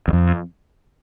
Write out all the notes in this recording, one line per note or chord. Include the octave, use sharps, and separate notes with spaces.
E2
F2